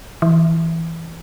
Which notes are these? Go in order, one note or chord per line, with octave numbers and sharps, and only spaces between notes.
E3